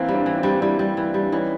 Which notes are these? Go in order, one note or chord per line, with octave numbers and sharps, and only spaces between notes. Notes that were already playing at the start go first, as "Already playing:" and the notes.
Already playing: E3 A#3 C4
G3
C4 D4
E3
C4 D4
G3
G3 D4 E4
G3
E3
G3
D4
E3 C#4 D#4